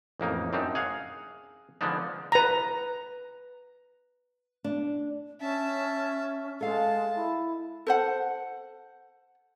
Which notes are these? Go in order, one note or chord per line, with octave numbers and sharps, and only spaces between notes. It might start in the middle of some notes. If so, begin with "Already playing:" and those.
A1 F2 A#3 D#4
F#2 C4 D4 D#4
G#4 F5 F#5
D3 F3 G#3 B3 D4 D#4
B4 A#5
D4
C#4 E5 A5
G#3 A4 F5 A5
E4
A4 C5 F#5